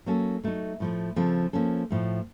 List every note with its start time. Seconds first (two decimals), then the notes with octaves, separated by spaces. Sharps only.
0.06 F#3 A#3 C#4 A4
0.43 F#3 A3 D#4
0.80 A2 F3 A3
1.16 C#3 F3 C4 F4 A4
1.53 F3 A#3 C#4 A4
1.90 A2 F3 A3